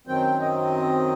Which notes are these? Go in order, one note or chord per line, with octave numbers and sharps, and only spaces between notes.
F#2 D#3 F#3 C4 G5
D#5